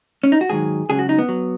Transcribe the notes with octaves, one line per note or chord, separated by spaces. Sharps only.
C#4
D#4
F#4
G#2 D#3 F#3 G#4
C#2 C#3 F#3 G#4
F#4
D#4
B3
F#3